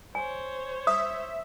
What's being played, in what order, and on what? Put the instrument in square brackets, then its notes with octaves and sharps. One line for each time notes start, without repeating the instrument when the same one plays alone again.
[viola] C5 C#5 [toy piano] G#5
[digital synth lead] E5 [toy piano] D#6